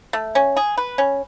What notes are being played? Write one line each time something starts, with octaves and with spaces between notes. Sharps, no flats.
A3
C#4
G#4
B4
C#4